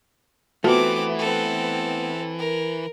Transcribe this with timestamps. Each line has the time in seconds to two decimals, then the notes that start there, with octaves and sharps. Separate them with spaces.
0.64 E3 A3 B3 C4 F4 F#4 D6
1.19 C4 A4
2.39 A#4